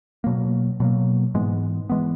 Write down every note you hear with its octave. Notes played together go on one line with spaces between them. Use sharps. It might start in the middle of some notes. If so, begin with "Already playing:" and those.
B2 F#3 A#3
B2 F#3 A#3
G#2 E3 G#3 B3
E3 G#3 B3